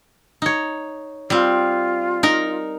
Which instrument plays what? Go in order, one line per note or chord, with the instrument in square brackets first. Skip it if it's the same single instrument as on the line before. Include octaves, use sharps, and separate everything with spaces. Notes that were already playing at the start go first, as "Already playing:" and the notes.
[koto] D#4 C#5
[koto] G3 C4 [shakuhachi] F4
[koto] D#4 A#4